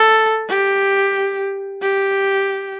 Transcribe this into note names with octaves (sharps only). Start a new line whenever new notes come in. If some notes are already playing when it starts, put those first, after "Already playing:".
Already playing: A4
G4
G4